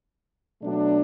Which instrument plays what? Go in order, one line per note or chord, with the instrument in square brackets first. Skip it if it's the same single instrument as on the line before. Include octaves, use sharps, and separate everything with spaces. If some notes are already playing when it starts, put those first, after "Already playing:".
[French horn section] B2 F#3 A3 D4